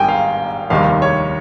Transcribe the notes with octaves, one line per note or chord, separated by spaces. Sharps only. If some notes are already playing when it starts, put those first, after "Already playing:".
Already playing: G#1 G#2 D#3 G3 G5 G#5 A#5
F5
F1 D#2 D#3 G3 F5
C#5